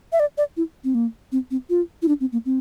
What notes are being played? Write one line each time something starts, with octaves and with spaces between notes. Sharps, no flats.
E5
D5
D5
E4
C4
A#3
C4
C4
F4
E4
D4
C4
A#3
C4